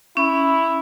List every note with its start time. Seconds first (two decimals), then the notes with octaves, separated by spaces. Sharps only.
0.17 C#4 E4